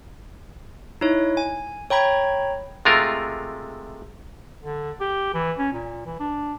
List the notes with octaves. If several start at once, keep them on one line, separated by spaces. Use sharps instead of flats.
D#4 E4 C#5
G#5
C#5 G5 A#5 B5 G#6
C3 G#3 A3 F4 A#4
D3
G4
E3
C#4
A#2
E3
D4